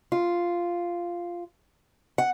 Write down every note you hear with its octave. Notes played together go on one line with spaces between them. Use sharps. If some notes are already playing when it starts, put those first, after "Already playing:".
F4
F#5